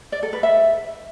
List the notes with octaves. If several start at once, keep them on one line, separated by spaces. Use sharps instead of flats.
D5
A4
B4
E5